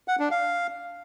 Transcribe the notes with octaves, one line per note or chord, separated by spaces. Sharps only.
F#5
D4
F5